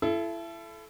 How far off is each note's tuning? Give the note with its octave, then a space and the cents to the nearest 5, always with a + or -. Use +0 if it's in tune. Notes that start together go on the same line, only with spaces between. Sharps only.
E4 +30 A4 -20